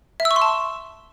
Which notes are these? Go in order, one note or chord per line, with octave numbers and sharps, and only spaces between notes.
E5
E6
C#6
C6
A5